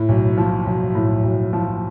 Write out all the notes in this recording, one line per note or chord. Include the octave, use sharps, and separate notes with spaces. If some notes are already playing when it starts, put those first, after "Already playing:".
Already playing: A2
B1
F3
B1
A2
B1
F3